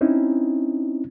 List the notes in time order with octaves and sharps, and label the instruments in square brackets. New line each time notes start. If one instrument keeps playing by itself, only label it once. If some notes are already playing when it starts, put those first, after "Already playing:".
[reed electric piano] C4 C#4 D#4 E4